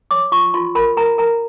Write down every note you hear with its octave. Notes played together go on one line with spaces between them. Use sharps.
C#5 D6
F4 C#6
F4 C6
A#4 B5
A#4 A#5
A#4 A#5